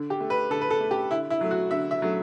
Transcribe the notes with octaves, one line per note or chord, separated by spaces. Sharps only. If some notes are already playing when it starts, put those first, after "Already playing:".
Already playing: D3
G4
A3
B4
D3 A4
B4
A4
A3
G4
D3 E4
E4
F#3 A3
F#4
D3 E5
E5
F#3 A3